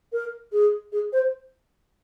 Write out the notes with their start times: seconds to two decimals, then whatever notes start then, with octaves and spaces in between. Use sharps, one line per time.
0.12 A#4
0.52 G#4
0.92 G#4
1.12 C5